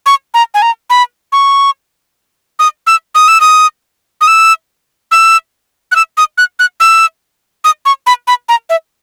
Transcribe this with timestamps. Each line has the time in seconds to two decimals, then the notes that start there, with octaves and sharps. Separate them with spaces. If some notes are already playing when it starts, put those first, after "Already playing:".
0.06 C#6
0.34 A#5
0.54 G#5
0.62 A#5
0.90 B5
1.32 C#6
2.59 D#6
2.87 E6
3.15 D#6
3.28 E6
3.41 D#6
4.21 D#6
4.27 E6
5.11 E6
5.92 F#6
5.96 E6
6.17 D#6
6.38 F#6
6.59 F#6
6.80 E6
7.64 D#6
7.85 C#6
8.06 B5
8.27 B5
8.49 A#5
8.70 E5